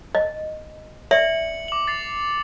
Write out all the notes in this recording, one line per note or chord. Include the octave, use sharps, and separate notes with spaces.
D#5
D5 E5 C#7 F#7
D6 F#7
A6 C7 F7